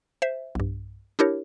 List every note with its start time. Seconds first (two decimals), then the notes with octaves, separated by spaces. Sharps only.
0.22 C5 E5
0.55 B1 G2
1.19 D4 E4 G4 A#4 C#5